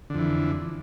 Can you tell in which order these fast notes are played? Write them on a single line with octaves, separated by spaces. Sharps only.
D3 F2 E3